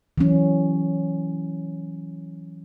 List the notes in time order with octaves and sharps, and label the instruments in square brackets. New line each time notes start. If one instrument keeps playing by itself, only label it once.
[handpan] E3 F#3 C#4